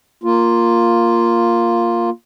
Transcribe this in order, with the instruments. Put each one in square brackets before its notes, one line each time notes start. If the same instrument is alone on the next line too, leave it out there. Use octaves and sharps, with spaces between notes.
[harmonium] A#3 F4